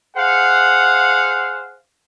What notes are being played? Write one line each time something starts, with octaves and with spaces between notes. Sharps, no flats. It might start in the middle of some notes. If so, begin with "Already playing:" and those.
G#4 C5 F5 F#5